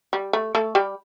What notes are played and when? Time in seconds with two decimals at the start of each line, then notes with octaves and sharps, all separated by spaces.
0.13 G3
0.33 A3
0.55 A3 A4
0.75 G3 G4